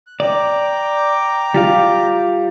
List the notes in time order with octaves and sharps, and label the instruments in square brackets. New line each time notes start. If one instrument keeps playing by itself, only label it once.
[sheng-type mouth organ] F#6
[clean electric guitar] D5 [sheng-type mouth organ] G5 A#5 D6
[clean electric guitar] G3 F4 F5